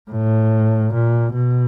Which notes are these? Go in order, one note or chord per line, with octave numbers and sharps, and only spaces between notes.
A2
A#2
B2